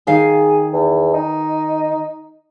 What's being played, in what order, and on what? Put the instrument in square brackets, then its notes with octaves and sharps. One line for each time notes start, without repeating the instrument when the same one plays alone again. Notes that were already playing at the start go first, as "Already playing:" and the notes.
[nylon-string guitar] D#3 F5 [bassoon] G#4
[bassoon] E2
D#4